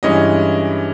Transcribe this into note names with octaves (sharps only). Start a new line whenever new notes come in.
G2 E3 G#3 C#4 D#5